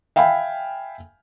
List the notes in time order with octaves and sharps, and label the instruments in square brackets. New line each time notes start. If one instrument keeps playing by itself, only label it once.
[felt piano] E5 F5 G5 G#5 B5